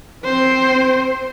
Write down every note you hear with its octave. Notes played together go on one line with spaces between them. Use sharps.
C4 C5